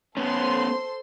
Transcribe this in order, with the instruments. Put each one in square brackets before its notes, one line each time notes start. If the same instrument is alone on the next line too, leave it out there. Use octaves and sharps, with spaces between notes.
[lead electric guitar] B3 C#4 [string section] A4 C5 C6